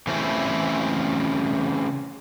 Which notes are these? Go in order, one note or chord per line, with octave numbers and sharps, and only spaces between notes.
C#3 E3 A3 C4 C#4 E4